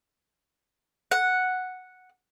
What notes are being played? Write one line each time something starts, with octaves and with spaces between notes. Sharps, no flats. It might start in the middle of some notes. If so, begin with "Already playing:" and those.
F#5